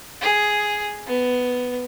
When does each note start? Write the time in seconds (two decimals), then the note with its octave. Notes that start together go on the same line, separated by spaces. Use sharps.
0.21 G#4
1.06 B3